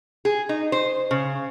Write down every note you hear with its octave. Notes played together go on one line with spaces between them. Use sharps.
G#4
D#4
C5
C#3